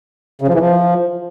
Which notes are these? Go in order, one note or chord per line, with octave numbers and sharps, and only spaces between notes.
C#3
F3
E3
F3